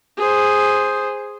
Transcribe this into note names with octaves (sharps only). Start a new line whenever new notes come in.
G#4 C5